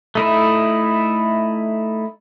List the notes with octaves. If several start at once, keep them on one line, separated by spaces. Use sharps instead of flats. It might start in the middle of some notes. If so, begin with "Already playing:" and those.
A3 D#4 E4